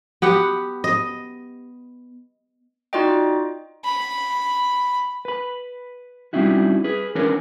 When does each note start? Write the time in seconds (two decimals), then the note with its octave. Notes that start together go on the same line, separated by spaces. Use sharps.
0.22 B3 G4 F#5
0.84 D#5
2.93 D#4 F4 F#4 D5 D#5 G5
3.85 B5
5.25 B4 B5
6.33 G3 C4 C#4 D#4 E4 F#4
6.84 G#4 B4
7.15 E3 C#4 D4 A#4 B4 C#5